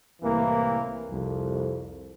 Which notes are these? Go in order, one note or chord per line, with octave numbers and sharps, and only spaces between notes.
C2 A2 E3 A#3
C2 F2